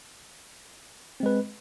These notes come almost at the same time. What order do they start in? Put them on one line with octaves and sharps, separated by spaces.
C4 G#3 B4